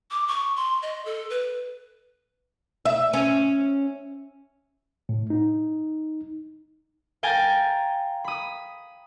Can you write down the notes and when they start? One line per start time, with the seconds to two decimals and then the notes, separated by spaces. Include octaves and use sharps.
0.11 D6
0.28 C#6
0.56 C6
0.82 D#5
1.05 A4
1.30 B4
2.85 E5
3.13 C#4
5.09 A2
5.30 D#4
7.23 F5 G5 G#5 A#5 A6
8.24 B5 D#6